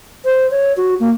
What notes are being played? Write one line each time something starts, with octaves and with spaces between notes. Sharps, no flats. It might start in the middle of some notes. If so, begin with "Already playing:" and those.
C5
C#5
F#4
A#3